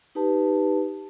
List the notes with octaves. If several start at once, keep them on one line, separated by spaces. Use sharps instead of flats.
D#4 G4 B4 A5